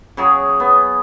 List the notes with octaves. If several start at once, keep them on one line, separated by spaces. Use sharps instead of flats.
C#3 F#3 G#4
B3